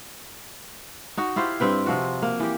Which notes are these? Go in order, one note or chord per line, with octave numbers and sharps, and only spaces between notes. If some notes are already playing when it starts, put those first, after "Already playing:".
D#4 F#4
E4 F4 G4 C5
G2 C4 B4 G5
C3 F3 F#4
A#3
E3 G4